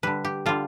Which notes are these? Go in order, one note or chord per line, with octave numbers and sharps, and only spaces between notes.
D3 G3 B4
G4
D3 G3 F4